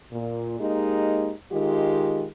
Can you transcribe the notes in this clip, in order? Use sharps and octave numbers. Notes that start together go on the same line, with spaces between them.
A#2
G#3 A#3 D#4 G4
D#3 G#3 F4 G4